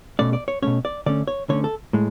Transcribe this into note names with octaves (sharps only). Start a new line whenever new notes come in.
B2 A3 C#4 D5
D5
C#5
B2 A3 C#4 C#5
D5
D3 A3 C#4 D5
C#5
D3 A3 C#4 C#5
A4
A2 G#3